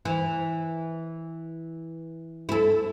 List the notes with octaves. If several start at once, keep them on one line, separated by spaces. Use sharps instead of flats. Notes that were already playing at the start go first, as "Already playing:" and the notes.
E3
E4 A4